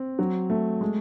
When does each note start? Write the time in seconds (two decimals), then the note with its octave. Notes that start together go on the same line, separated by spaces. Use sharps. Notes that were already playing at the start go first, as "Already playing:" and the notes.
Already playing: C4
0.19 F#3
0.50 A3
0.81 G#3